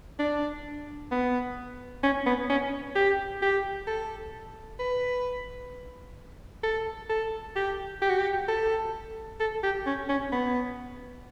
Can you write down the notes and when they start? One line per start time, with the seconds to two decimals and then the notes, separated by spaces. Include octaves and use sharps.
0.19 D4
1.11 B3
2.04 C#4
2.26 B3
2.50 C#4
2.96 G4
3.42 G4
3.87 A4
4.79 B4
6.64 A4
7.10 A4
7.56 G4
8.02 G4
8.10 F#4
8.19 G4
8.48 A4
9.40 A4
9.63 G4
9.86 C#4
10.09 C#4
10.32 B3